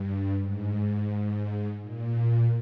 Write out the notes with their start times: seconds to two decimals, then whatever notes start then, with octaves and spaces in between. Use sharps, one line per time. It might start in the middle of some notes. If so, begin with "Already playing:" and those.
Already playing: G2
0.41 G#2
1.82 A#2